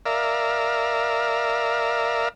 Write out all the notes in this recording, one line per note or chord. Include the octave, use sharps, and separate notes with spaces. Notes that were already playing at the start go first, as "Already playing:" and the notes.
A#4 D5 E5 F5